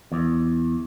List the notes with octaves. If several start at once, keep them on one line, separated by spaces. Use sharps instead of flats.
E2